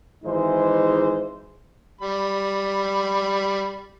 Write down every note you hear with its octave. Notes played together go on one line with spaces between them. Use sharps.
G#1 E3 G#3 D#4 C5
G3 B5